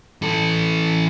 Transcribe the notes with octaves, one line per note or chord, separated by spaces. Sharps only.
E3 A4